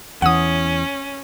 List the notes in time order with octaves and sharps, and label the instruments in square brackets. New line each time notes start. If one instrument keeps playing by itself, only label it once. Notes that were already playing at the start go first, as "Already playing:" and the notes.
[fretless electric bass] E2 E3 [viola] C#4 [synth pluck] F#5 D#6